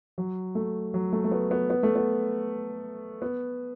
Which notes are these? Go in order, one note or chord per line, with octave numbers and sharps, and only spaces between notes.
F#3
A3
F#3
A3
A3
B3
B3
B3
A3
B3
B3